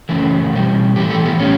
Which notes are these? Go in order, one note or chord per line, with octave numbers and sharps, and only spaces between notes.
F#2 C#3 E3 A3
B2 G3
A2 E3 A3 G4
A4
B3
A2 G3 C#4